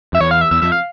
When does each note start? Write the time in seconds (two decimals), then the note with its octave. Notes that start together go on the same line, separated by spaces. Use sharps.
0.13 F2 E5
0.21 E2 C#5
0.31 F5
0.41 E5
0.51 E2 E5
0.62 F2 E5
0.72 F5